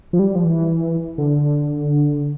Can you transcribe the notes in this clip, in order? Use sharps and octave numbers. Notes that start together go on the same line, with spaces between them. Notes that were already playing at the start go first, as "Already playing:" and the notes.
F3
G3
F3
E3
D3